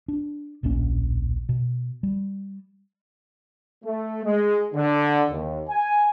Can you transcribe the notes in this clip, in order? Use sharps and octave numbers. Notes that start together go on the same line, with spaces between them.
D4
D1 A#1 A#3 C#4
B2
G3
A3
G#3
D3
D#2
G#5